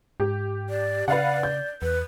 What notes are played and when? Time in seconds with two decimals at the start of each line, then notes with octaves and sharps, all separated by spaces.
0.20 G#2 G4
0.70 D5
1.08 C#3 B4 D5 F5 F#5
1.43 G6
1.82 E2 B4